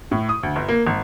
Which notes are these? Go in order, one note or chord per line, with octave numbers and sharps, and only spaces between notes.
A2
D#6
D2
G1
A#3
G#1